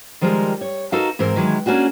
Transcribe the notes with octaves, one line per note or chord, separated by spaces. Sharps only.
D#3 F3 G3 G#3 A#4
C#5
D#4 F#4 A4 A#4 D#5 F5
G#2 E3 C4 A#4
D#3 E3 F#3 G#3
A#3 C#4 D4 F#4 G#4